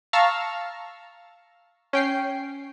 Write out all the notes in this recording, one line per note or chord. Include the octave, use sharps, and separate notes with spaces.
F5 A5 A#5 C#6 E6 F6
C#4 G5 C7